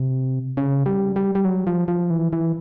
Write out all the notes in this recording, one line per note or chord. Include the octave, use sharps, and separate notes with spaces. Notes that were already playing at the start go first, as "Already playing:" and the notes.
Already playing: C3
C#3
G3
G3
G3
F#3
F3
F3
E3
E3